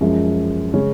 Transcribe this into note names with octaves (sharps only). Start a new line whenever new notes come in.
F#2 F3 G#3
C#3 G#3 C#4